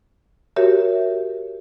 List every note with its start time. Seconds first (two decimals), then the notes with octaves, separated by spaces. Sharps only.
0.56 F#4 G4 A#4 C#5 E5